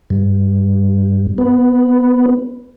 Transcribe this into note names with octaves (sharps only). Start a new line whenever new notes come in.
G2
B3